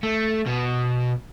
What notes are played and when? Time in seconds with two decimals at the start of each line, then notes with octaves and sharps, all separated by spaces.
0.03 A3
0.46 B2